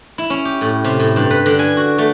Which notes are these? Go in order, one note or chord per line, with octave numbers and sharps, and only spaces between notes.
E4
C#4
G4
A2
C3
A2
G2
B4
D3
G#5
F#4
A3